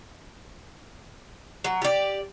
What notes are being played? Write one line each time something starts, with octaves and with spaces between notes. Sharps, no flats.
F#3
G4 D5